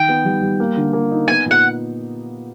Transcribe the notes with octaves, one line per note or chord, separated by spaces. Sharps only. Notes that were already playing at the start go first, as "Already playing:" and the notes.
Already playing: D#3 G5
B3
G3
G3
A#3
D3
A#3
D#4
B3 G#5
A#2
F#5